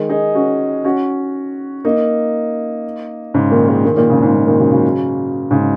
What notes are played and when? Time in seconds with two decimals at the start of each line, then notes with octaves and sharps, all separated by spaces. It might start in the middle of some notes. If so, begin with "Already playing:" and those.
Already playing: D#3 G#3
0.09 D#4 G#4
0.35 C#4 F#4
0.84 C#4 F#4
1.85 A#3 D#4
3.34 G#2 C#3
3.51 A#2 D#3
3.67 D#3 G#3
3.84 D#3 G#3
3.97 A#2 D#3
4.09 G#2 C#3
4.22 G#2
4.34 A#2
4.46 A#2 D#3
4.59 C#3 F#3
4.72 C#3 F#3
5.51 G#2 C#3